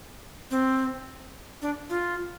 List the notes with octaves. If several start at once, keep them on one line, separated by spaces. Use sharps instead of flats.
C4
D4
F4